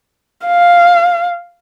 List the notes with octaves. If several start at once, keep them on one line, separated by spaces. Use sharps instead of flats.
F5